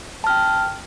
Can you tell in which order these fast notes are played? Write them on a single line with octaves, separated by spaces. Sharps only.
A5 F6 G5